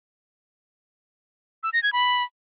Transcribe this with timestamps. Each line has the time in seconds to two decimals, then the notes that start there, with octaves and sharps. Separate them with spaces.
1.63 E6
1.73 A#6
1.83 G#6
1.93 B5